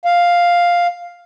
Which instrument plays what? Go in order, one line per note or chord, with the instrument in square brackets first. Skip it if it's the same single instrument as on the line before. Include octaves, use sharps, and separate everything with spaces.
[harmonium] F5